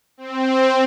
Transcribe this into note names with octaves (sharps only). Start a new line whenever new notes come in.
C4